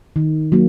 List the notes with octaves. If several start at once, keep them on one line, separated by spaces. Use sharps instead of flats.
D#3
F#3 A#3